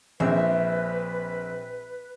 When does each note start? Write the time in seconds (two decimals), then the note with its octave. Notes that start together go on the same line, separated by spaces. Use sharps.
0.20 A#1 C4 B4 E5